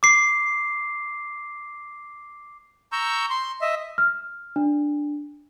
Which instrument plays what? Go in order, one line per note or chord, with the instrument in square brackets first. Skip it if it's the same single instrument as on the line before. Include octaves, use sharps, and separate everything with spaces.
[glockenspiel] D6 C7
[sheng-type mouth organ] A#5 C#6 E6 G6
C6
D#5 E5
[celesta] F6
D4